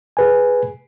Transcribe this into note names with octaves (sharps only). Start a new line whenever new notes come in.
G#4 B4 G#5